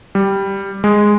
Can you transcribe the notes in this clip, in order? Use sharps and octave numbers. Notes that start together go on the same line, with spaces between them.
G3
G#3